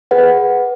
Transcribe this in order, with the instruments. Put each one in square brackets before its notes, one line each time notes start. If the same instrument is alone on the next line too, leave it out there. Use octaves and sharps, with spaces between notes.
[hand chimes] G#4 B4 F#5